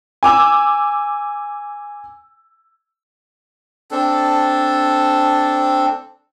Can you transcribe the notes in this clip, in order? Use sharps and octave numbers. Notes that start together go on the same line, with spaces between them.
G#5 D6 E6
C4 D4 A4